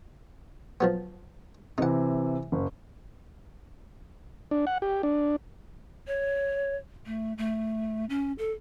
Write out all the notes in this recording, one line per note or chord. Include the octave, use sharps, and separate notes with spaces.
F3 F#3 B3
C3 E3 D#4 F#5
F#1
D4
F#5
G4
D4
C#5
A3
A3
C#4
A4